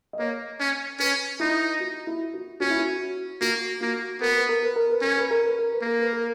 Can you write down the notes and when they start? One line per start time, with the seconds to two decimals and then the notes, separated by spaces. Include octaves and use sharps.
0.13 D#5
0.19 A#3 C#5
0.60 C#4
1.00 C#4 B4
1.40 D#4 E4
1.80 F#4
2.07 E4
2.34 F#4
2.60 C#4 F#4
2.70 E4
2.79 F#4
3.41 A#3 F#4
3.81 A#3 F#4
4.21 B3 A#4
4.35 B4
4.49 A#4
4.63 B4
4.76 A#4
4.90 B4
5.01 C#4 A#4
5.17 B4
5.31 A#4
5.45 B4
5.58 A#4
5.72 B4
5.82 A#3 A#4
5.99 B4
6.13 A#4